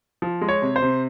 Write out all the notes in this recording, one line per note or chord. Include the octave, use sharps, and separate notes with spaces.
F3
G#3
C#5
C3
C5
C3